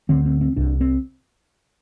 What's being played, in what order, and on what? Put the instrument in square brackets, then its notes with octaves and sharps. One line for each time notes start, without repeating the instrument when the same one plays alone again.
[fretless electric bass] D2 D3 C4
C4
C4
C2 C3 D4
C4